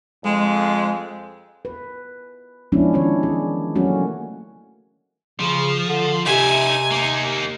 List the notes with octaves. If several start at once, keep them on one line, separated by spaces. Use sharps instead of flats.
F2 G#3
B4
F3 G#3 B3 C#4 D4 E4
D#3 G#3 C#4 D4 C#5
E3 G#4
F#3 A3 A#3 C#4 F#4
C#3 F3
D3
C3 D#4 E5 G#5
A#3 D#4